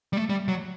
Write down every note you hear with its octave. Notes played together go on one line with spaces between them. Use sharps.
G3
A3
G3
F#3